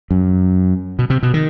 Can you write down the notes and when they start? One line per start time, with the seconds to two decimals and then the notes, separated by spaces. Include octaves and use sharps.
0.11 F#2
0.99 B2
1.10 C3
1.23 B2
1.34 D#3